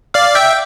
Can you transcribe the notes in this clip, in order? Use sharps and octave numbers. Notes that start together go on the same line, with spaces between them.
D5 F5
E5 G5